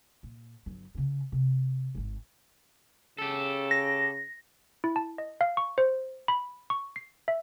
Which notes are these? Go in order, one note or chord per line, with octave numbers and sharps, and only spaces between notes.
A#2
G1 F#3
C#3 C#4
C3
G#1 G#2
C#3 G4 A4
A#6
E4
A5
D#5
F5
C#6
C5
B5
C#6
C7
E5